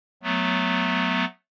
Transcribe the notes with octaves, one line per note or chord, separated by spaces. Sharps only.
F#3 A3 B3